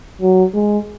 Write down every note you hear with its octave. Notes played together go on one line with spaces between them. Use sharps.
F#3
G#3